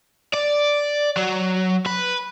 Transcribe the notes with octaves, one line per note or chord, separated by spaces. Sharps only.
D5
F#3
B4